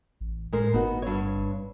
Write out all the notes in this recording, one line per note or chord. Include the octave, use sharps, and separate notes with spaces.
A1
A2 G#3 A#4 C5
G1 B3 D#4 F#4
G2 C4 C#5